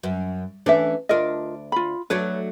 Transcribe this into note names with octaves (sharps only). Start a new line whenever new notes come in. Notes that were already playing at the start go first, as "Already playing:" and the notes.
F#2
E3 A3 C#4 D4 E5
D2 D4 F4 A#4 D#5
F4 B5
F#3 A3 D4 B4 C#5